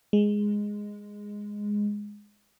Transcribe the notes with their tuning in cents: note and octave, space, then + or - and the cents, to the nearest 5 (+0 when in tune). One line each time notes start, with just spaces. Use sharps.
G#3 -5